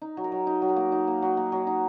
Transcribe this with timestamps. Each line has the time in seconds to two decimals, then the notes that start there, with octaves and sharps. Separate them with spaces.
0.01 D#4
0.17 F#3
0.24 A#4
0.32 F#3
0.47 D#4
0.62 F#3
0.69 A#4
0.77 A#3
0.92 D#4
1.07 A#3
1.22 F#3
1.37 A#3
1.52 F#3
1.67 D#4